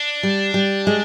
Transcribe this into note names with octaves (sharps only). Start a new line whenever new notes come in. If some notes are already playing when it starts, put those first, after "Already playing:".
Already playing: D4
G3
G3
G#3